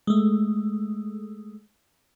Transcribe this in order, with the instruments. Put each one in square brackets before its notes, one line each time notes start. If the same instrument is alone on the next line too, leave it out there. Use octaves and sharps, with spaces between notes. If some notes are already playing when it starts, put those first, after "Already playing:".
[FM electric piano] G#3 A3